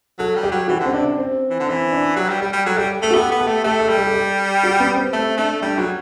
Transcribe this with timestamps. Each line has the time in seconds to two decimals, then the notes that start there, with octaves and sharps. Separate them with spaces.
0.19 F#3 A4
0.36 G3
0.43 G4
0.52 F#3
0.68 E3 F#4
0.80 D3
0.86 C4
0.93 C3 D4
1.18 C4
1.50 E3
1.60 D3
1.67 E3 C4
1.92 D4
2.16 F#3 G4
2.29 G3
2.41 G3 G4
2.53 G3
2.66 F#3 A4
2.77 G3 G4
3.02 A3 A4
3.11 F#4
3.15 B3 G4
3.32 B3
3.40 A4
3.47 A3
3.64 A3 G4
3.80 A4
3.89 G3
3.98 G4
4.07 A4
4.14 G4
4.63 F#4
4.80 B3
4.95 C4
5.13 A3 C4
5.37 A3 D4
5.62 G3 D4
5.78 F#3 F#4